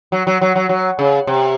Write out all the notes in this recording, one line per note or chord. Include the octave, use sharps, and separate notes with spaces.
F#3
F#3
F#3
F#3
F#3
C#3
C3